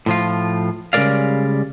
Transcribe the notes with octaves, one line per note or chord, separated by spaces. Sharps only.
A2 F3 F4
C#3 G3 G#3 A#4 D5 F5